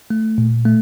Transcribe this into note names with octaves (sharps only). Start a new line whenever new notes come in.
A3
A#2
A3